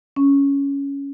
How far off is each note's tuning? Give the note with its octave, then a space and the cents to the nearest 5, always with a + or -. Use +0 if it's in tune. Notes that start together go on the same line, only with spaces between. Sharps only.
C#4 +10